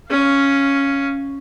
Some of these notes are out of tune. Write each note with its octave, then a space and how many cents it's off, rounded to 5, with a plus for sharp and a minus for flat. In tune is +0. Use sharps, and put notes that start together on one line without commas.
C#4 +0 F5 +0